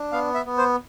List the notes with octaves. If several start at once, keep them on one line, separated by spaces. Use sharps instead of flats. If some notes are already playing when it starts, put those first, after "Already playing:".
Already playing: D4
B3 F5
E5
B3
C5